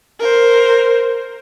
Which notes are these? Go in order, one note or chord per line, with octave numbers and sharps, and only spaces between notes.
A#4 C5